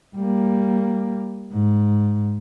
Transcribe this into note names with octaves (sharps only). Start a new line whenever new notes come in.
G3 A#3
G#2